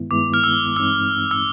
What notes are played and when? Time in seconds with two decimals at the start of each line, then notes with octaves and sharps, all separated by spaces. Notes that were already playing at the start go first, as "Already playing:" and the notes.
Already playing: G2 D#3 G#3 B3 E4
0.11 G2 D#3 G#3 B3 E4 D6
0.34 F6
0.44 E6
0.76 G2 E3 G#3 C4 D#4 E6
1.31 E6